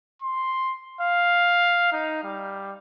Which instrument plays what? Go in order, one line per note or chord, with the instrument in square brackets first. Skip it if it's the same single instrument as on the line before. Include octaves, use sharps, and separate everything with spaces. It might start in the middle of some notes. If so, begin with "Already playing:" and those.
[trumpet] C6
F5
D#4
G3